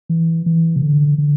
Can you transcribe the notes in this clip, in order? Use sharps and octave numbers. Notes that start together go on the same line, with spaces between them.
E3
E3
C3
D3
D3